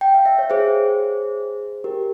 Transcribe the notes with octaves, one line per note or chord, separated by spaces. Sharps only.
G5
F5
E5
C#5
G#4 C5
G4 A#4